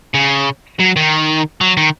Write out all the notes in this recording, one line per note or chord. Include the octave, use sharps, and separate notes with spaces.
C#3
F#3
D#3
F#3
D#3